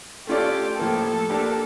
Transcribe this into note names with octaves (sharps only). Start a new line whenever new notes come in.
A3 C#4 F4 G4 A4 D5
A2 F3 A#3 A4
A#3 D4 G4 A#4